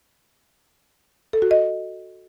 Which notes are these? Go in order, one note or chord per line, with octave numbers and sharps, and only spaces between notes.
A4
F#4
D#5